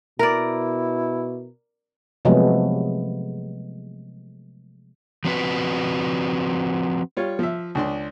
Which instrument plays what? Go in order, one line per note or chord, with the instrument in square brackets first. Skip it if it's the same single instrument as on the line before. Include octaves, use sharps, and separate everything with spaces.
[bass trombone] B2 [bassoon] E4 [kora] A#4 D5
[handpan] C3 F3 F#3 G#3 A3 B3
[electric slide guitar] F3 C4 F#4 B4
[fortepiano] G3 F4 C#5
F3 E5
C#2 D4 C6